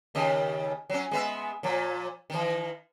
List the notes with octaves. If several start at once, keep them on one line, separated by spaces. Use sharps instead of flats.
D#2 C#3 D#5
F#3 C#4
G#3 B3 E5
A#2 F3
D#3 E3